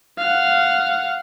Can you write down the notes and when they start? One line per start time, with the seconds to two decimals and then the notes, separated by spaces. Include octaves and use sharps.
0.18 F5 F#5